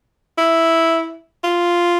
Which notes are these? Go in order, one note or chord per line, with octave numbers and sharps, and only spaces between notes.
E4
F4